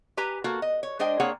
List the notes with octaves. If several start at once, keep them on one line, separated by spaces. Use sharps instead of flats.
G4 B4 G#5 A#5
A#3 F#4 A4
D#5
C#5
G#3 D4 C5 D#5 G5
A#3 C4 D4 G#4 C#5 F#5